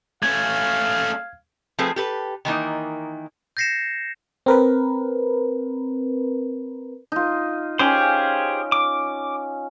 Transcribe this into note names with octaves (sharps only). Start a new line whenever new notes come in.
A3 C#4 F5 G#6
F3 A3 C4 G#4 A4 B4
G4 A4 B4
D#3 E3 A#3 D#4
G6 A6 A#6 C7 C#7 E7
C4 A#4 B4
D#4 F4
C#4 G4 G#4 C5
D6